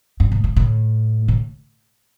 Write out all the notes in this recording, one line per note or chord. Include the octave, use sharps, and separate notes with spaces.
G2
A2
A2
A2
A2